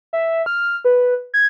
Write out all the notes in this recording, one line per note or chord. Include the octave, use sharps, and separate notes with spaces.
E5
F6
B4
G#6